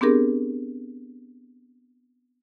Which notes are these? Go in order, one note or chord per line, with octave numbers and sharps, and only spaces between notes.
B3 C4 D4 G4 G#4 A#4